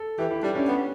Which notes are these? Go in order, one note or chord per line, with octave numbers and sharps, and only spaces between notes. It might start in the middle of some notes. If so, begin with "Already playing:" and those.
Already playing: A4
E3 G4
E4
G3 D4
C#4
B3